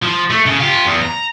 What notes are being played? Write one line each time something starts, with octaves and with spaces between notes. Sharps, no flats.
F3
A3
C#3
F4 G4
E2
A#5